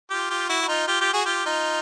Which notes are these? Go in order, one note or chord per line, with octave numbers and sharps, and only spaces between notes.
F4 G4
F4 G4
E4 F#4
F#4
D#4 F4
F4 G4
F4 G4
F#4 G#4
F4 G4
D#4 F4